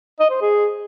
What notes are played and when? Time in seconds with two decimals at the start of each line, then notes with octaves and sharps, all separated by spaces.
0.19 D#5
0.30 C5
0.41 G#4